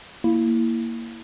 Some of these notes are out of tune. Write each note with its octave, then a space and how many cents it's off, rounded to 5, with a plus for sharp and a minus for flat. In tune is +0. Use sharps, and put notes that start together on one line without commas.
A#3 -5 E4 +0